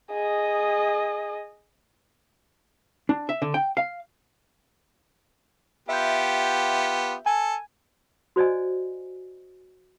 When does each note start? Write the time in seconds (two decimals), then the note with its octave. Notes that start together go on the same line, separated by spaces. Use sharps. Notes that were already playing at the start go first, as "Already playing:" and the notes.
0.12 G#4 D#5
3.09 D4
3.29 E5
3.42 D3
3.54 G5
3.77 F5
5.89 B3 F4 G4 E5 G6
7.26 A4 G#5
8.36 F#4 C5 D5 D#5 G#5